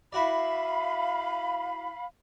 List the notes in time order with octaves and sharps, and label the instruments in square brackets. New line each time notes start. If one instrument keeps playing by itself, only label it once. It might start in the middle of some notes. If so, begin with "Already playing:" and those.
[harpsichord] E4 F#4 D5 [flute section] F5 B5